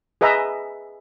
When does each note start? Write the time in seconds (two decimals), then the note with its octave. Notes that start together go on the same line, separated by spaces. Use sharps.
0.21 G#4 B4 D#5 E5 A#5